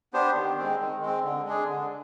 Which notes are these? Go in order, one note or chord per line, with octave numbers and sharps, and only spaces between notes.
B3 D4 G4 C5
D#3
G#3 C4
D#3
G#3 C4
D3
G#3 D4 G#4
D3